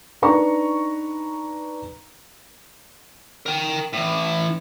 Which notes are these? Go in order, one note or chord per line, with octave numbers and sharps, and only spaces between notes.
D4 D#4 B4 A#5 C#6
A#4 G5
A2 E3